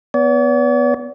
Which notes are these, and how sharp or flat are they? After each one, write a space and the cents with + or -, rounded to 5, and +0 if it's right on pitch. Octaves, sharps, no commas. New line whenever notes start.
B3 +0 D5 -45